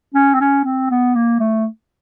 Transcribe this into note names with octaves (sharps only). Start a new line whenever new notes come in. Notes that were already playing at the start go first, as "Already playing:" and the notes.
C#4
C4
C#4
C4
B3
A#3
A3